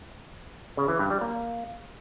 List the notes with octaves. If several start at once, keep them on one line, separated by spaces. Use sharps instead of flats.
C#3
E3
G2
G3
A#3